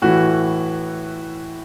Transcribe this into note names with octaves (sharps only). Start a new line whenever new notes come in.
A2 E3 F#4